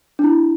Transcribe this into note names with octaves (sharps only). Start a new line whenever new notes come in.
D4
E4